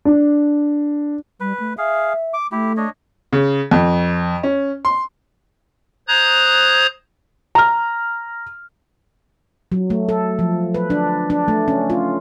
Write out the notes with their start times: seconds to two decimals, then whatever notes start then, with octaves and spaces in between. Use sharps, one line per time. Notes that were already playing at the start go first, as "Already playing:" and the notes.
0.05 D4
1.40 G3 B4
1.60 A3
1.78 G#4 E5 F5
2.34 D6
2.52 A3 E4 G4
2.77 D4 C#5 D#5
3.33 C#3
3.71 F2
4.43 C#4
4.85 C6
6.08 C5 A#5 D#6 F#6 G#6
7.55 A#5 F6
9.72 F#3
9.90 A3
10.09 A4
10.39 F3
10.74 B4
10.90 D4
11.30 D4
11.48 A3
11.68 C#4
11.90 F4